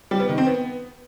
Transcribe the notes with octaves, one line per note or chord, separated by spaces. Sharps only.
G3
B3
D#3
C4
B3